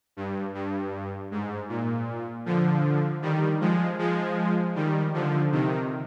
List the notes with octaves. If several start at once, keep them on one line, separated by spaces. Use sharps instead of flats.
G2
G2
G#2
A#2
D3 F3
D#3 G3
F3 G#3
F3 G#3
D#3 G3
D3 F3
C3 D#3